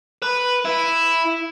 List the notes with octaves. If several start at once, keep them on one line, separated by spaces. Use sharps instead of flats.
B4
E4